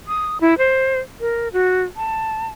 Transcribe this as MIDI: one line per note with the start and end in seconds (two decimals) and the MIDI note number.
0.08 0.38 87
0.41 0.57 64
0.58 1.00 72
1.20 1.48 70
1.53 1.82 66
1.96 2.47 81